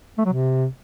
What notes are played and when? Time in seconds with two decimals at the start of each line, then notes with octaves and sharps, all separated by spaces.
0.18 A3
0.26 F#3
0.33 C3